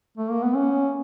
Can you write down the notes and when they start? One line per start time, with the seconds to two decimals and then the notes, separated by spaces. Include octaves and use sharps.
0.18 A3
0.31 A#3
0.44 B3
0.56 C#4